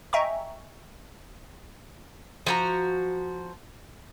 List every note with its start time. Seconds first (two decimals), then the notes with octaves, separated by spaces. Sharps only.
0.13 D#5 E5 G5 G#5 A#5 C#6
2.46 F3 F#4 A#5